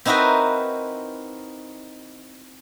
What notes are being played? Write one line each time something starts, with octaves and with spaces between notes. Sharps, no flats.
C4 D#4 E4 F#4 A#4 B4